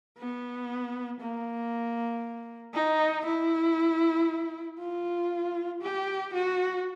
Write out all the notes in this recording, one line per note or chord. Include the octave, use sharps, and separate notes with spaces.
B3
A#3
D#4
E4
F4
G4
F#4